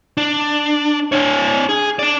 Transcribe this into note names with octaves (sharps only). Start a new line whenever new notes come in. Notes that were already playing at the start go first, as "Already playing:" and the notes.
D4
D4 C#5
G#4
D4 D5